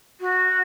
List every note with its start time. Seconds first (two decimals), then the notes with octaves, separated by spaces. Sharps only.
0.21 F#4